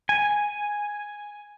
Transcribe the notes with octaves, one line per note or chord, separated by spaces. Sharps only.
G#5